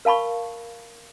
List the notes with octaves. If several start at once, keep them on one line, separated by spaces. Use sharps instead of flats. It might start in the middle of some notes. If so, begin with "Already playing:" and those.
A#4 F5 A5 B5 C#6